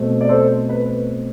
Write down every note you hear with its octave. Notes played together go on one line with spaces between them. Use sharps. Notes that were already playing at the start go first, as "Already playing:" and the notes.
Already playing: B2 A3 C4
D5
A4 C5
B4